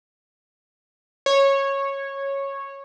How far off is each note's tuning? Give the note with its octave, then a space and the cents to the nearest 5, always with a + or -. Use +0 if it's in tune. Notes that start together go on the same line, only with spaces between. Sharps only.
C#5 -10